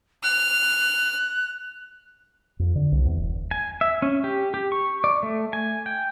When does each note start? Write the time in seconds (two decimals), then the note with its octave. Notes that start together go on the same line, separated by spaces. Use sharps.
0.23 F6 F#6
2.59 F2
2.76 D3
2.92 C2
3.05 E2
3.18 E1
3.51 G#5
3.81 E5
4.02 C#4
4.24 G4
4.54 G4
4.72 C#6
5.04 D5
5.23 A3
5.53 G#5
5.86 G5